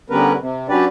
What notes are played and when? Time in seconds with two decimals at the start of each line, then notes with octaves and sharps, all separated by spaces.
0.10 D3 G3 B3 C#4 A#4 B4
0.39 C3
0.69 F#3 C#4 D4 G4 B4 D5